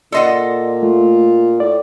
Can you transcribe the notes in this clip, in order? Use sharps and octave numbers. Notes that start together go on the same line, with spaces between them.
A#2 A4 D5 D#5 F#5 C6
A3 F4
A2 D5